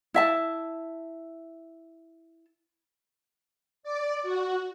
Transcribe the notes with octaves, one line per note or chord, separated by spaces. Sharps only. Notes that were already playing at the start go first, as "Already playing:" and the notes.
E4 E5 A5
D5
F#4